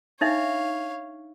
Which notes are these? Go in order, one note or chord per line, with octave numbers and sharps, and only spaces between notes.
D4 D#4 C#5 E5 F5